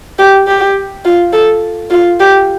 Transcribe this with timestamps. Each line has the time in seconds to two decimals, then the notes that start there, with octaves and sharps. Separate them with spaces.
0.19 G4
0.47 G4
1.05 F4
1.33 A4
1.90 F4
2.20 G4